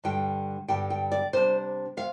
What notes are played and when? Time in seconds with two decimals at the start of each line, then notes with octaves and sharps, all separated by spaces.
0.04 G2 D3 G3 G5
0.68 G2 D3 G3 G5
0.90 G5
1.12 D5
1.33 C3 G3 D4 C5
1.97 C3 F5